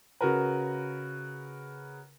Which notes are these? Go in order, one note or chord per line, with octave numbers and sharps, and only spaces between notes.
C#3 F#4 A#4 B4